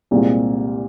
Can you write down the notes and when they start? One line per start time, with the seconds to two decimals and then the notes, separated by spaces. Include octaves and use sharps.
0.11 C2 A#2 G#3 C4